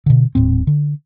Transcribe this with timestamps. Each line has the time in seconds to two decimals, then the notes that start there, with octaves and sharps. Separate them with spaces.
0.06 B2 D3
0.35 D#1 A2 C4
0.67 D3